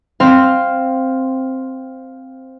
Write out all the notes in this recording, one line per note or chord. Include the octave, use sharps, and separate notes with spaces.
C4 F5